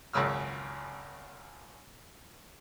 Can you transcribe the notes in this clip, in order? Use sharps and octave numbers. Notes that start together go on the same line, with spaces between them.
G#1 C#2 F#2 C#3 E6 F6